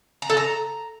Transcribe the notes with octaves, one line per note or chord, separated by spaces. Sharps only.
A#5
A4
A#5